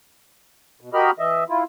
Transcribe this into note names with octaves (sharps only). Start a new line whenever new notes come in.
B2
F#4 G4 A#4 D#5 B5 F6
E3 D#5 E5
E4 F4